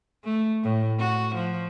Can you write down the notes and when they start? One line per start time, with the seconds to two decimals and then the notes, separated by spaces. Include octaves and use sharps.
0.25 A3
0.64 A2
0.99 F#4
1.35 F3